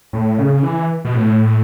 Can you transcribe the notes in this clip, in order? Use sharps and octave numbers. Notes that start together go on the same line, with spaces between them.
A2
C#3
E3
B2
A2